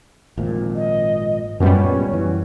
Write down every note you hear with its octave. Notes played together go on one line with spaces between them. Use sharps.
G#1 A#2 F3
D#5
D1 F#2 A#2 G3 B3 C#4
E3